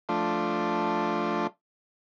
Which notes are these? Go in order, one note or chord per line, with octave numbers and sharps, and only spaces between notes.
F3 A3 D4 F4